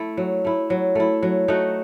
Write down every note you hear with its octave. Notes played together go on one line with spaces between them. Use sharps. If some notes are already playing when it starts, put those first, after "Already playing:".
Already playing: A3 E4
F#3
A3 E4
F#3
A3 E4
F#3
A3 D#4 F#4